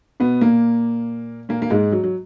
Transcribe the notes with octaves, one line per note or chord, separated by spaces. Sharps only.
B2 B3
A#2 A#3
A#2 A#3
A#3
G#2 G#3
F#3
F#3